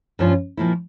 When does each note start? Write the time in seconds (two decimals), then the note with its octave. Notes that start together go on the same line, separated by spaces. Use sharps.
0.19 G2 F3 C#4 F4
0.57 A#2 F3 A#3 E4